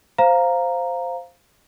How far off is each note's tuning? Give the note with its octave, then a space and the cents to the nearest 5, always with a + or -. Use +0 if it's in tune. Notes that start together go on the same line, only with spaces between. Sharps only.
C5 +0 F5 +0 A#5 +0